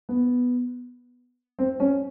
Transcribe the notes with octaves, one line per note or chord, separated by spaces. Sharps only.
B3
C4
C#4